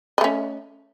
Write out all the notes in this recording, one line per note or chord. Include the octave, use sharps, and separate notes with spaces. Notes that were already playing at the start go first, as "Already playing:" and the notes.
A3 C#4 D#5